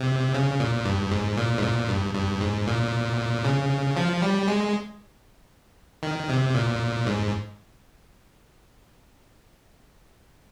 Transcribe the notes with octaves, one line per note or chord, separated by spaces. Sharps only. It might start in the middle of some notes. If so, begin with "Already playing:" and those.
Already playing: C3
C#3
A#2
G2
G#2
A#2
G#2
A#2
G2
G2
G#2
A#2
C#3
F3
G3
G#3
D#3
C3
A#2
G#2